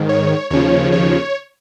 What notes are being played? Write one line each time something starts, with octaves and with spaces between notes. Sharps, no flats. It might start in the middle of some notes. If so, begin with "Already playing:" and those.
Already playing: G#2 D#3
C#5
D#2 C#3 F3 C#5
C#5